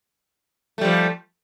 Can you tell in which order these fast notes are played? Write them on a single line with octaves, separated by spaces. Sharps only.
A3 G3 F3